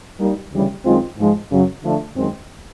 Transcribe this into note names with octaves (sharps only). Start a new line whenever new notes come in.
G3 A#3 D#4
D2 C#3 E3 G3
F#2 D#3 G#3 C4 F4
G#2 F3 G#3
F#2 C#3 F#3
D3 F3 A3 D4
F#2 D#3 G#3 C4